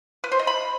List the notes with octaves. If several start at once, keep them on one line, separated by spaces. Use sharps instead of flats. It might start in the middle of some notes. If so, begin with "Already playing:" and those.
B4
C5
D#5
B5